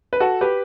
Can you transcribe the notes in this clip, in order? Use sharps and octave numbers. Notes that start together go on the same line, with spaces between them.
B4
F#4 A4
G4 B4